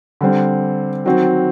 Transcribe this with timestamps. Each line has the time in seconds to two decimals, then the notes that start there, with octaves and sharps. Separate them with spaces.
0.21 D3 G3 C4
1.05 D#3 F#3 C4 F#4